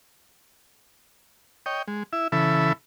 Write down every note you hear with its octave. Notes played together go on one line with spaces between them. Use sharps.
C#5 D#5 G5
G#3
E4 E5
C#3 E3 A4 E5 B5